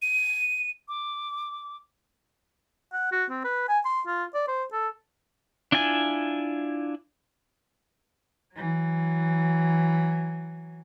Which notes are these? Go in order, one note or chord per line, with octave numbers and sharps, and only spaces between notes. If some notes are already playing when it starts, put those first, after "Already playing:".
D#7
D6
F#5
F#4
C4
B4
G#5
C6
F4
D5
C5
A4
D4 E4 F4 G#5
E3 F#3